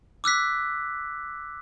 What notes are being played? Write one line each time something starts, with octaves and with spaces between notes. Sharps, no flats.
D6 E6 F#6 B6